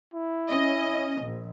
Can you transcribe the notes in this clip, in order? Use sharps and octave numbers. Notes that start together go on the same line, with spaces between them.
E4
C#4 D#5
A#1